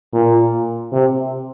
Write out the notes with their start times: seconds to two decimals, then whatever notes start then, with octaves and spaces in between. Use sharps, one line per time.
0.13 A#2
0.92 C3